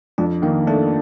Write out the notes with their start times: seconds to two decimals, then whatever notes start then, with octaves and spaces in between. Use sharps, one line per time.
0.18 F2 D4
0.42 D#3 A#3
0.67 A3 D4